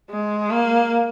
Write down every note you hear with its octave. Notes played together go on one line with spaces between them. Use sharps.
G#3
A#3